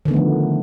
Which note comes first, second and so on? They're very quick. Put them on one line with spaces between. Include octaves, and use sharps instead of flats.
D#3 D3 B3 A3 F3